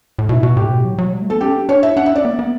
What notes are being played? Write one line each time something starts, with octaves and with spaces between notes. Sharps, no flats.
A2
B2 E4
B2 F#4
A2 G4
B2
F#3
F#3
G3
A3
B3 A4
C#4 G4
D4
D4 C#5
E4 E5
D4 F#5
E5
C#4 D5
B3
B3